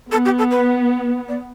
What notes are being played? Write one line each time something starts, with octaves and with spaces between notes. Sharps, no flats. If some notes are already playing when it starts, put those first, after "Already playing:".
B3 A4
G4
A4
B4
D5